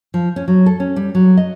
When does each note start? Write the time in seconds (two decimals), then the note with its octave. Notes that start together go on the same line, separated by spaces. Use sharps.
0.14 F3
0.36 C#4
0.48 F#3
0.66 A4
0.80 C#4
0.96 G3
1.15 F#3
1.37 D#5